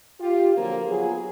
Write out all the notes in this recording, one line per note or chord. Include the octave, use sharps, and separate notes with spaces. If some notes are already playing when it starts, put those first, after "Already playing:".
F4 G4
D3 F3 F#3 A#3 C4
F#3 B3 F4 G#4